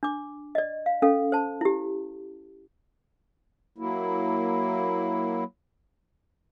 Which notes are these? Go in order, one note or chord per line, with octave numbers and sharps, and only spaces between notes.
D4 D6
D5 D#5
F5
C#4 A4 F5
C5 A5
E4 G4
F#3 A#3 E4